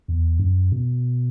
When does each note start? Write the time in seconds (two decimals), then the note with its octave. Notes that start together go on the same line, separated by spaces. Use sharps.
0.08 E2
0.40 F#2
0.72 B2